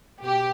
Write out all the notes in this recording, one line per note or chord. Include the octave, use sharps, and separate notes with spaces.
B2 G4